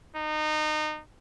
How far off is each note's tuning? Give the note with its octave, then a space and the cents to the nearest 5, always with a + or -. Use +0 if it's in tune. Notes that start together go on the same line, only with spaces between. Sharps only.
D#4 -25